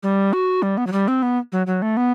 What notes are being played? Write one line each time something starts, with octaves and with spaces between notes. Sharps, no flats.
G3
F#4
G3
B3
F#3
G3
C4
B3
F#3
F#3
A3
B3